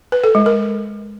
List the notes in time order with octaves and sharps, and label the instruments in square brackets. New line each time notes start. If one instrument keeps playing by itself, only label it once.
[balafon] B4
A4
G#3
A#4